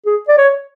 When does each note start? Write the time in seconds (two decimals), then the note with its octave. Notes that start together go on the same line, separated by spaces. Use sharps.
0.06 G#4
0.28 D5
0.38 C#5